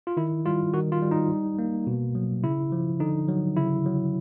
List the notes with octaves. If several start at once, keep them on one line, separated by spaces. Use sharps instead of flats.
F4
D#3 E4
G3 F4
D#3 F#4
F4
G3
D#4
G3
A#3
B2
F#3
C#3 E4
F3
D3 D#4
F#3
C#3 E4
F#3